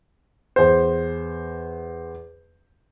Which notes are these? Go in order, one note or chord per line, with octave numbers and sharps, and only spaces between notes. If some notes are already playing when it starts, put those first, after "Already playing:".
E2 C5